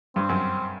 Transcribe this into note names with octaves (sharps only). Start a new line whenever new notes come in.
G2 C4
F#2